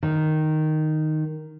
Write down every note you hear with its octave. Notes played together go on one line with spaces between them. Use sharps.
D#3